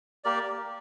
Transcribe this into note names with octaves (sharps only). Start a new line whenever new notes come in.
A#3 G4 A#4 D5